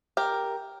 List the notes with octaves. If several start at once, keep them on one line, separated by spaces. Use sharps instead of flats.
G4 A#4